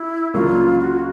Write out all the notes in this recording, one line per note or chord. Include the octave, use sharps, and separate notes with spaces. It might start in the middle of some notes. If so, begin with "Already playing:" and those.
Already playing: E4
C#2 C#3 F#3 A#3 D4 F4
F#4